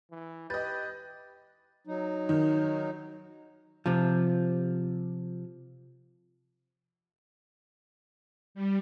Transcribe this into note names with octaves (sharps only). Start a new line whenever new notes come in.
E3
G4 B4 D#5 G6 A6
F#3 D#4
D#3
C3 F3
G3